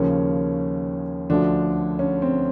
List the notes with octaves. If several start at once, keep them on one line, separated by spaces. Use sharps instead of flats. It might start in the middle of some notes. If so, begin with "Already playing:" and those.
Already playing: D#2 C#3 F3 C#4
D2 D3 F3 D4
C#4
C4